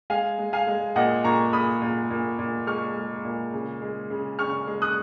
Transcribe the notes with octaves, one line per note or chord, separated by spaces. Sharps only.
G#3 F5 G#5
G#3
F5 G#5
G#3
A#2 D#5 F#5
A#2 A#5 C#6
A#2 B5 D#6
A#2
A#2
A#2
G#3 C#6 F6
G#3
A#2
C#3
G#3
C#3
C#3 C#6 F6
G#3
D#6 F#6